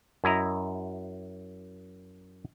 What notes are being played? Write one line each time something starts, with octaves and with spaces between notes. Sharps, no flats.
F#2 E4 D#5 A#5